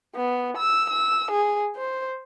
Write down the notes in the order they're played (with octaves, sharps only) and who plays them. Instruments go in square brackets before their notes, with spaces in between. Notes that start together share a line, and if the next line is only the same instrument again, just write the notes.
[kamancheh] B3
E6
E6
G#4
C5